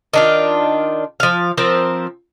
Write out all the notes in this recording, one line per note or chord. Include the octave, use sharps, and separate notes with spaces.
D#3 D4 F4
F3 F5
F3 C4 A#4 C5